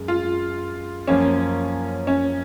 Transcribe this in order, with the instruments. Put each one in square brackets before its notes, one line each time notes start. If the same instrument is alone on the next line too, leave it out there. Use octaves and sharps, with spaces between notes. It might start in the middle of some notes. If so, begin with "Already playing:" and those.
Already playing: [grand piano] F#2 G#3
[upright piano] F4
[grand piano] F#2 F3 A#3 [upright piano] C#4
[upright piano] C#4